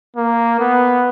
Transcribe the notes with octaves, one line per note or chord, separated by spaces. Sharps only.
A#3
B3